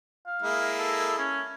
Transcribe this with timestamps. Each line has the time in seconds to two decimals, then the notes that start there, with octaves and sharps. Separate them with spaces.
0.27 F5
0.42 G#3 A#3 E4
0.79 A4
1.18 C#4